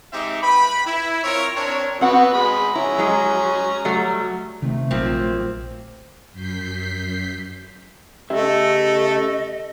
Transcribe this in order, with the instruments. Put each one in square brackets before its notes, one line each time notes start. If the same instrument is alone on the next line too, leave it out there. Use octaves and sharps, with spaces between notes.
[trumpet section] G#3 C4 D#4 G4 E5
B4 G5 B5
E4
C4 F4 A#4 C#5
C4 D4 A#4 C#5
[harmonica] B3 F#4 B4 [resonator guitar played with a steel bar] C4 F#5
[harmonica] G#3 B5
[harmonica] C#4 A#5 [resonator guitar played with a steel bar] E4
[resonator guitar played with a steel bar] F#3 G#3
F#3 G3 A3
[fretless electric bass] C3 D#3 [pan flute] A3
[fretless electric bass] A#1 F#3 [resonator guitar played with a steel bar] F3 A#3 C4
[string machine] F#2 G6 B6 C7
[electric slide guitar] C#3 G4 E5 [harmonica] A3 [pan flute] D#5